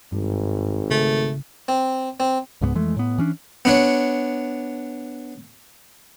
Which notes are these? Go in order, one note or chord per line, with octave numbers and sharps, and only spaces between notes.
G#1 G2
C#3 A3
C4
C4
C#2 G#2 A3 B3
F2 E3 G#3 A3
A2 B3
E3 C#4 D4
B3 D4 C#5